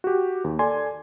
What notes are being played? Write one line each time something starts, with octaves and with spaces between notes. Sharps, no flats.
F#4 G4
D#2
A4 D5 G#5 C6